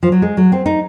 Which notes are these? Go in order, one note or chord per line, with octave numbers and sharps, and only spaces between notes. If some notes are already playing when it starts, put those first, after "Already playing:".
F3
F#3
G#3
F#3
C4
D#4